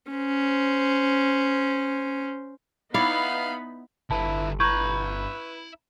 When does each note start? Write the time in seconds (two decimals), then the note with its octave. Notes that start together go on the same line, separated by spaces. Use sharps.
0.11 C#4 C5
2.94 B3 D#4 E4 C#5 D5 F5 B5
4.11 G1 D3 E4 B4 A5
4.60 E4 B4 A#5 C#6 G6 G#6